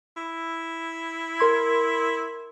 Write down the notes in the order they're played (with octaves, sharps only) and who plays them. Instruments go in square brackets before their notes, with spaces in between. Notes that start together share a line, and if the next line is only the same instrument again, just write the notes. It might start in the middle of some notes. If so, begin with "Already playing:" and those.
[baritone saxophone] E4
[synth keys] A#4 C6 G#6